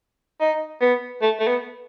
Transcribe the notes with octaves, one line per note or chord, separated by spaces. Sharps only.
D#4
B3
A3
A3
B3